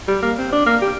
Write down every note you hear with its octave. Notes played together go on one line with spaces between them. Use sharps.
G3
A#3
C4
D4
A#3
G4